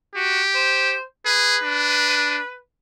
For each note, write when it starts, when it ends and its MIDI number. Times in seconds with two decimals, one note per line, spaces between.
0.16 0.41 66
0.16 0.95 67
0.55 1.02 72
1.26 1.58 68
1.26 2.57 71
1.63 2.39 62